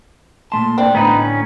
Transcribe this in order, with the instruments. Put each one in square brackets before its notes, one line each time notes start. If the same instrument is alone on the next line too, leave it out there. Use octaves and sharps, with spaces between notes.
[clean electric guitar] A#2 A3 A5 [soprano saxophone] C6
[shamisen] C4 [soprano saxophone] D4
[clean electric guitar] A2 D3 [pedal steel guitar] B3 D#4 B4 [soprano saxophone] A#5
[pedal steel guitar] C#4